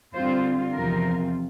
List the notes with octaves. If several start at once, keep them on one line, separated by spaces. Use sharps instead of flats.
D3 G3 C4 F4 C5
E2 C3 F3 C4 F4 A#4